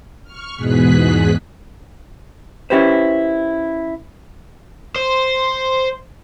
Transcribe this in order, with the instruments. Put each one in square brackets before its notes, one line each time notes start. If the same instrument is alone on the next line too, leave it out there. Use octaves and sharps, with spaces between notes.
[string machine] C#6 F6
E2 G#2 B2 G#4 F#6 B6
[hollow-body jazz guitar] C#4 E4 G4 B4 C5
[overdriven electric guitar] C5